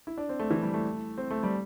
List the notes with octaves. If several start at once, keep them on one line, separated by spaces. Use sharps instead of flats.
E4
D4
C4
A3
E3
G3
A3
C4
A3
G3